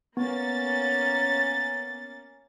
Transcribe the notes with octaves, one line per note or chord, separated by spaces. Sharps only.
A#3 B3 C#4 A6